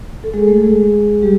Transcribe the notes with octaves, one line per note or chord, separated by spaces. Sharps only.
A4
G#3 G#4
A3 A4
G#3 G#4
G3 G4